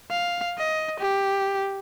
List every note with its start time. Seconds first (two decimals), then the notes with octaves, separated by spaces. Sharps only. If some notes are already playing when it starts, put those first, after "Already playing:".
0.10 F5
0.58 D#5
1.00 G4